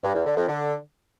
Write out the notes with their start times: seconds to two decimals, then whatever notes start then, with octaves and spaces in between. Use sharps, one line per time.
0.04 G2
0.15 E2
0.26 D3
0.37 F2
0.48 D3